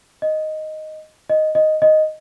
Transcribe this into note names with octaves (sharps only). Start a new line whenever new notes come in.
D#5
D#5
D#5
D#5